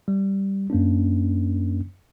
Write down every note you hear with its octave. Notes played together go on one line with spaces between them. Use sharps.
G3
F#2 A#3 C#4 D4